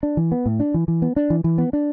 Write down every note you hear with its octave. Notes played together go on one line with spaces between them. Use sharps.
D4
E3
B3
A2
D4
E3
E3
B3
D4
E3
E3
B3
D4